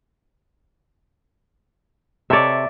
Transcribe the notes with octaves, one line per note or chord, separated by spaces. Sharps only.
C3 A4 C#5 D5 E5